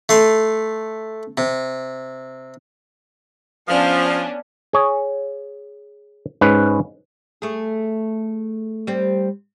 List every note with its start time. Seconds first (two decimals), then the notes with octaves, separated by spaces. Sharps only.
0.09 A3 C6
1.38 C3
3.68 F3 B3 C#4 D4
4.73 G#4 C#5
6.41 G#2 C#4 B4
7.42 A3 G#4
8.87 G3 C4